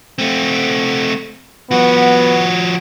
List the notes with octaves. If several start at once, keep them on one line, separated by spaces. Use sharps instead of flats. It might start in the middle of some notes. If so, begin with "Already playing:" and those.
A3 C4
F3 B3 F#4